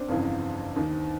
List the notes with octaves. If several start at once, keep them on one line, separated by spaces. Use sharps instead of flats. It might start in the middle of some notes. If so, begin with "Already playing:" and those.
Already playing: C4 D4
G1 F2 C#3 E3
D#2 D#3